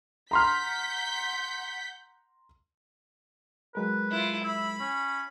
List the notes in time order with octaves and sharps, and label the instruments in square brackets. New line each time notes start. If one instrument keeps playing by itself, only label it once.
[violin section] F#5 G6 B6 [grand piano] A#5 C6 F6
[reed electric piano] F#3 G#3 A#4 [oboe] B4
[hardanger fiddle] E4 F4
[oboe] E4 [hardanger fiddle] B5
[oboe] C#4